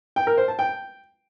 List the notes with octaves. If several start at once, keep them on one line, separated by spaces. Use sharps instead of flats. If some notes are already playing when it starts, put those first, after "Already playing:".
G5
A#4
C5
A5
G5